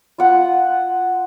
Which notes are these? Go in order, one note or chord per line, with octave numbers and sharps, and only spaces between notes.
F4 F#5